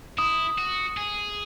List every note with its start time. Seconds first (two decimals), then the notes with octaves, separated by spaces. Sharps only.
0.18 E4 D#6
0.58 F#4
0.97 G#4